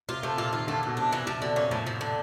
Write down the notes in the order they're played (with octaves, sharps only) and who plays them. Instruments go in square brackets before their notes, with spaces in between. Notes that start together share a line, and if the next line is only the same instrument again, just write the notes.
[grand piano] C3 [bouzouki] F4
[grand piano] C3 [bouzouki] A3
[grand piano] A#2 [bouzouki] F4
[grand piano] D#3 [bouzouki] F4
[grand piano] D3 [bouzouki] A3
[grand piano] B2 [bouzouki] A3
[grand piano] C3 [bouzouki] D4
[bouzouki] E3
[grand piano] C3 [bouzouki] F3
[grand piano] B2 [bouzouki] D3
[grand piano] A#2 [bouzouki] C#4
[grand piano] A2 [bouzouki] F3
[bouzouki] F3
D3